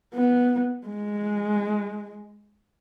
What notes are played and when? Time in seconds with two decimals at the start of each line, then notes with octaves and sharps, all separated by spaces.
0.14 B3
0.87 G#3